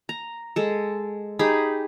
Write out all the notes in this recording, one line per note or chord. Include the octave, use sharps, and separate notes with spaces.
A#5
G#3 A4
D#4 G4 G#4 B5